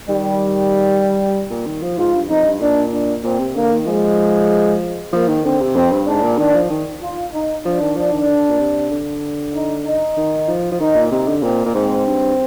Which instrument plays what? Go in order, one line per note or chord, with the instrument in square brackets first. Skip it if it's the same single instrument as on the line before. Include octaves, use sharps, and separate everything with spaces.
[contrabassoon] D#3 [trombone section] G3
[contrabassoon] A#2
D#3
F3
[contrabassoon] G#2 [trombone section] F4
[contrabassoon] G2
[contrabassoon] F2 [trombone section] D#4
[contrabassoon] G2
[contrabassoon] A#2 [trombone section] D4
[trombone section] D4
[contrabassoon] A#2 [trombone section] C4
[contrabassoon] C3
[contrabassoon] D3 [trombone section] A#3
[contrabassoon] D#3
[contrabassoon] F3 [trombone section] G#3
[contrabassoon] F3 [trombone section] A#3
[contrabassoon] D#3
[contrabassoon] D3 [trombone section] C4
[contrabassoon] C3
[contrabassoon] F2 [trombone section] C4
[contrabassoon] G2
[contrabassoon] G#2 [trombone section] D4
[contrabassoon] A#2
[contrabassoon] D#3 [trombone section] D4
[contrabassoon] F3
D#3
[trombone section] F4
D#4
[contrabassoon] F3 [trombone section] D4
[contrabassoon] D#3
F3
D#3
D#3
D3
A#2
C3
D3
[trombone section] D#4
D#4
[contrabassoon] D#3
F3
F3
[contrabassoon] D#3 [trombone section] D#4
[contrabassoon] A#2
[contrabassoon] C3 [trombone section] D#4
[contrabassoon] D3
[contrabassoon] A#2 [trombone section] C4
[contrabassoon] A#2
[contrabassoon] G#2 [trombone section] C4
[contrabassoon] G2